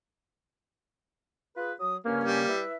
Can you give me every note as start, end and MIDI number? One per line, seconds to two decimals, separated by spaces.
1.57 1.73 65
1.57 1.73 68
1.57 1.73 71
1.80 1.96 54
1.80 1.96 87
2.05 2.43 43
2.05 2.43 49
2.05 2.50 58
2.05 2.43 61
2.24 2.60 55
2.48 2.76 64
2.48 2.76 71
2.48 2.76 76